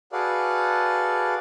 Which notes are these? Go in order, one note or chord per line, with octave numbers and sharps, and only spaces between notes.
F#4 G#4 A4 B4 D5 F5